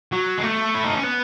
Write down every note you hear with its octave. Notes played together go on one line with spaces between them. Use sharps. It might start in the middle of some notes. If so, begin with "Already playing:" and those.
F#3
G#3
A3
E4
D#4
C#4
B3